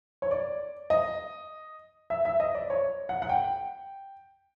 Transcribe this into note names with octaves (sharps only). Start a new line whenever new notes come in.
C#5
D5
D#5
E5
E5
D#5
D5
C#5
F#5
F#5
G5